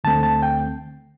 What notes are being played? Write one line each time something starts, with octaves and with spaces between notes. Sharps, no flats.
D2 D3 A3 C4 A5
A5
G5